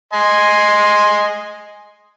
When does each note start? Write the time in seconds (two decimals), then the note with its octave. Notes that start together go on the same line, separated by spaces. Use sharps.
0.13 D#5 G#5 C6